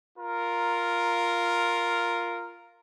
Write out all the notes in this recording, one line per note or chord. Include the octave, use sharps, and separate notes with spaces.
F4 A#4